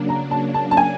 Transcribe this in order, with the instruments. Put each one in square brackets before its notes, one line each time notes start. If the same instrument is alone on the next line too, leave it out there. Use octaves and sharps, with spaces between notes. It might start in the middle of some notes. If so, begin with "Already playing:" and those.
Already playing: [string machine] C#3 F#3 A#3 D4
[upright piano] A#5
A5
A5
A5
G#5